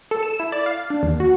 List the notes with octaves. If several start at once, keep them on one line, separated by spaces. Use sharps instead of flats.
A4
E7
E4
D5
F5
D4
D#2
F#4